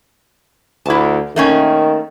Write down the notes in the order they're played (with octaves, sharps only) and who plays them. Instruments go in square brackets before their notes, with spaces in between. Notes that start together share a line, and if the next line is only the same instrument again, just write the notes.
[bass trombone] D2 [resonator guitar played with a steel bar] E4 A5
[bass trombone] D#3 [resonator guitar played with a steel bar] A3 A#3 C#4